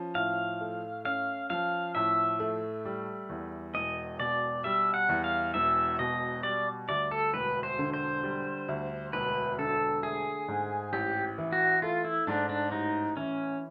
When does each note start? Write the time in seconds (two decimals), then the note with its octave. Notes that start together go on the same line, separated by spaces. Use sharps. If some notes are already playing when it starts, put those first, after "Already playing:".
Already playing: F3 C#4
0.15 A2 F5
0.61 A3
1.05 C#4 F5
1.50 F3 F5
1.95 A2 E5
2.40 A3
2.85 G3
3.30 E2
3.74 E1 D#5
4.20 B2 D5
4.64 G3 E5
4.94 F#5
5.09 E2
5.24 F5
5.54 E1 E5
5.99 B2 D#5
6.43 G3 D5
6.89 D2 D5
7.11 A4
7.33 E1 B4
7.63 C5
7.78 D3
7.94 C5
8.23 G3
8.68 D2
9.13 E1 B4
9.58 D3 A4
10.02 A3 G#4
10.48 G#2
10.93 A1 G4
11.38 E3
11.52 F#4
11.82 A3 F4
12.05 E4
12.27 G#2 D4
12.49 D4
12.72 A1 D#4
13.17 E3 C#4